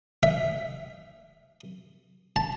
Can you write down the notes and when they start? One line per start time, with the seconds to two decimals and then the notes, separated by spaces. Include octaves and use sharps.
0.23 E5
2.36 A5